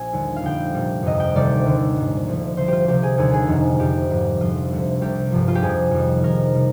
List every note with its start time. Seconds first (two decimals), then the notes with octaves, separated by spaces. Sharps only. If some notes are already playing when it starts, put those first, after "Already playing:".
Already playing: A#1 G#5
0.13 D#2 D3 G3
0.36 F5
0.42 F1 F2 D3 G5
0.74 C2 A#2 G3
1.02 G1 F2 C3 D#5
1.20 G5
1.35 D2 C3 D#3 G3 D5
1.65 D#2 D3 G3
1.96 A#1 G#2 G3
2.26 D2 D3 F3
2.57 D2 D3 F3 C5
2.68 F4 G4
2.88 C2 C3 F3 G4
3.03 G#4
3.18 D#2 D3 G3 G#4
3.34 G#4
3.47 F1 F2 C3 D#3 G3
3.79 F2 C3 G3 G4
4.10 G#1 G#2 F3
4.40 F2 D3 F3 F4
4.71 D2 C3 G3
5.01 C2 C3 G3 G4
5.32 G1 G2 F3
5.48 F4
5.55 G4
5.62 F2 C3 F3 G#4
5.91 F2 D#3 G3
6.23 F2 C3 D#3 A#4
6.54 C3 G3